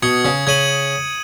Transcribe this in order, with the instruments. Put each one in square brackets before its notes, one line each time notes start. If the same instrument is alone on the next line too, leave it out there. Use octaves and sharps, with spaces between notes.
[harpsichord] B2 [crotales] D#6 G#6 C#7
[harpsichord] C#3
[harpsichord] C#3 [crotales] G#6 D#7 F#7